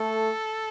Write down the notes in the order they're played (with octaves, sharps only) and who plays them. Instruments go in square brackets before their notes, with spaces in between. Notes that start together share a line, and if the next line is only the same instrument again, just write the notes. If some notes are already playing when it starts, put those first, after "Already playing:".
Already playing: [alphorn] A3 [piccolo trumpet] A4